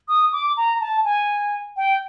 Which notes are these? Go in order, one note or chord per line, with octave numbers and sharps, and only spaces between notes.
D#6
D6
A#5
A5
G#5
G5